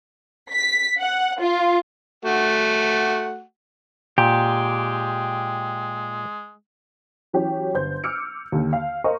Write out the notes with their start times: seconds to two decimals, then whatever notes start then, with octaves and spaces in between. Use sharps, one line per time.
0.52 B6
0.99 F#5
1.40 F4
2.25 A3 F#4 F#5
4.18 A#2 G#3 G4
7.33 E3 F#3 C#4 G4 C#5
7.74 G1 C5 G6
8.03 D6 E6 F6 C#7 D7
8.52 D#2 D3
8.73 F5
9.04 A#4 C5 D#5 C#6